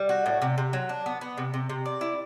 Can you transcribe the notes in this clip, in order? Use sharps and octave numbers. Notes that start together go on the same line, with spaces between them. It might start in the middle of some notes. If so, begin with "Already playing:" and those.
Already playing: G3
F#4
A2
C3
C3
F#3
D4
B3
B3
C3
C3
C3
D5
E4